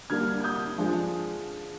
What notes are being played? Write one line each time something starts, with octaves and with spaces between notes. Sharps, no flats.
D3 G3 A#3 D4 F6 G#6
G#6
D#6 G6
F3 G#3 D4